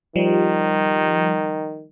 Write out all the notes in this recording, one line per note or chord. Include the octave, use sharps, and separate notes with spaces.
D#3 F3 G3